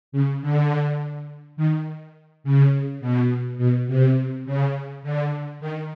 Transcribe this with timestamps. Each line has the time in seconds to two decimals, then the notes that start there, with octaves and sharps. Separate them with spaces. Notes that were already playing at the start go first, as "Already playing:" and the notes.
0.12 C#3
0.42 D3
1.57 D#3
2.44 C#3
3.01 B2
3.58 B2
3.88 C3
4.46 C#3
5.03 D3
5.60 D#3